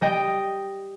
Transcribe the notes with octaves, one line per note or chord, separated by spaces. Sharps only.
G3 D#5 G5